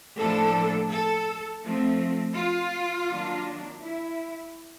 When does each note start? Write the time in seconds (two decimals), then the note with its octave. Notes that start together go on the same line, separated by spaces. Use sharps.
0.18 A2 F3 A#3 D4 A4
0.90 A4
1.64 F3 A3 C4
2.36 F4
3.09 D#3 F#3 A#3 D4
3.81 E4